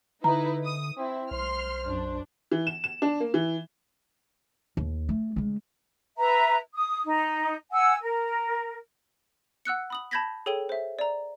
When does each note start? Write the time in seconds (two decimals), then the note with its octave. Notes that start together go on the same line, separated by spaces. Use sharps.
0.24 D3 D#4 E4 B4 A#5
0.65 D#6
0.98 C4 E4
1.31 B1 C5 C6 F6
1.87 F#2 D4
2.52 E3
2.67 E7
2.84 E7
3.02 D4
3.20 A#3
3.34 E3
4.77 D#2
5.09 A3
5.36 C#3 G#3
6.18 B4 E5 A#5
6.74 D#6
7.05 D#4
7.72 F#5 G#5 E6
8.01 A#4
9.65 F#5 E6 F#6 C#7
9.90 B5 D#6 F#7
10.11 A5 B5 G6 G#6 A#6 B6
10.46 G#4 A4 C#5 G5 D#7 G7
10.69 C5 E5
10.99 D5 A#5